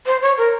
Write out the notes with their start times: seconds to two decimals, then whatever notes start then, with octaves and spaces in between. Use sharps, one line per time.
0.06 C5
0.22 C#5
0.38 A#4